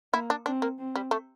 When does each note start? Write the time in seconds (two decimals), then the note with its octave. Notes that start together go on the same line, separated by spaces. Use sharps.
0.13 A#3 E4
0.30 D4
0.46 C4 D4
0.62 A#3
0.79 C4
0.96 G3
1.11 A3